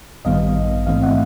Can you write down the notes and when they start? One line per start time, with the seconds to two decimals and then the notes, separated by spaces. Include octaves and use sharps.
0.25 A1 G2 D#3 G3 B3 D#5 F5
0.86 G#2 E3 A3 C4 D#5 F5
1.03 E5 F#5